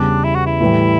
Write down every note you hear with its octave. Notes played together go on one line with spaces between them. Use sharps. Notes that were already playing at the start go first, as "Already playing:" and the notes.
Already playing: E2 C#3 G3 D4
E4
F#4
E4
A2 E3 G3